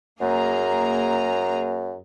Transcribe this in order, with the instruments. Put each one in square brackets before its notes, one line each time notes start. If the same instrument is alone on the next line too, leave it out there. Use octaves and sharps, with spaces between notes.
[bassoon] F#2 [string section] A#3 G#4 A#5